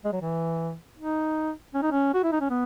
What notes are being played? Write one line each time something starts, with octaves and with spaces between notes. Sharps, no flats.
G#3
F#3
E3
D#4
C#4
D#4
C#4
F#4
E4
D#4
C#4
B3